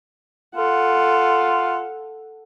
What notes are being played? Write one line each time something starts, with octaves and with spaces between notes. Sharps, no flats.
F4 A4 F#5